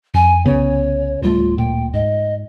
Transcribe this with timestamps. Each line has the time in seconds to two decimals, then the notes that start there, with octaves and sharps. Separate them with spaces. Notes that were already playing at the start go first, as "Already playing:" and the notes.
0.14 F2 G#5
0.46 C2 C#3 B3 C#5
1.22 D1 G3 A3 F4
1.58 A#2 G5
1.94 G#2 D#5